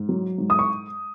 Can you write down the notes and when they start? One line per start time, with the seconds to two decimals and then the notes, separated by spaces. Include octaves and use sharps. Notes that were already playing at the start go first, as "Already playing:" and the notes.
Already playing: G#2
0.09 F#3
0.38 G#2
0.50 D#6
0.59 C#6